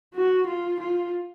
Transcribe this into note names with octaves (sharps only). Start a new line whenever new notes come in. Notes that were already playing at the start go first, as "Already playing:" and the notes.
F#4
F4
F4